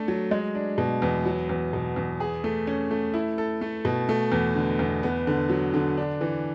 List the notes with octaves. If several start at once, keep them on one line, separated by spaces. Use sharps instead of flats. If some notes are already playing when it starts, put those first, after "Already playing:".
Already playing: A3 D4 A4
F#3
G#3
D4
B2
E2
F#3
E2
B2
E2
G#4
A3
C#4
A3
E4
A4
A3
B2
A3
E2
D3
E2
B3
D3
F#3
D3
D4
E3